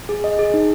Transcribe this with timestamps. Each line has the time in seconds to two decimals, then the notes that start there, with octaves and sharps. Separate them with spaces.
0.09 G#4
0.24 D#5
0.39 G#4
0.54 D#4